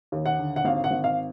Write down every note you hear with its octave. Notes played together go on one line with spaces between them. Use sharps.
D#2
F#5
D3
F#5
G#1 F5
F#5
G#1
F5